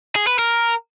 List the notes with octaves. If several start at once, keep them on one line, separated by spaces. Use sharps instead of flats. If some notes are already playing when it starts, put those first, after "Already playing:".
G#4
B4
A#4